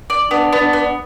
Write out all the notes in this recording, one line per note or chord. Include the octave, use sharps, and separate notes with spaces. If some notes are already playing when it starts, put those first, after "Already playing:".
D5
B3 D4
B3
D4
B3